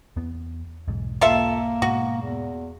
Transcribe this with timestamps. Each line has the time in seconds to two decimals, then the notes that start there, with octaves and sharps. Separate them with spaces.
0.16 E2 B3
0.88 B1 E2 G#2
1.21 A#3 F4 A4 E5
1.82 G#2 B2 F#4
2.22 E2